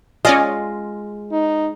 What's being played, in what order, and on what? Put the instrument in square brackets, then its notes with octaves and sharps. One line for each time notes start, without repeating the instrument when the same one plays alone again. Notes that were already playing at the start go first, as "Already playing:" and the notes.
[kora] G#3 F4 [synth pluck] C#4 D5 D#5
[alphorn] D#4